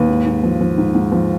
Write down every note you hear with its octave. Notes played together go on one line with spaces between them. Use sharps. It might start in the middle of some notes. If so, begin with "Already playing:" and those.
Already playing: D#2 B4
G#2
G#2
F3
F3
G#2
G#2
F3